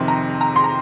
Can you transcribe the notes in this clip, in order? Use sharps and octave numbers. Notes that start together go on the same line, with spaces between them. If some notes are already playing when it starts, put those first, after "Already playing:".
Already playing: F2 C3 D#3 C6
A#5
A#5
C6
A#5